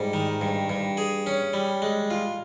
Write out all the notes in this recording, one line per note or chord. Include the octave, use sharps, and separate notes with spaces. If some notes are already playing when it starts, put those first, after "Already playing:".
Already playing: G#2 G3
D#3
G2
G2
G#4
C#4
G3
G#3
F4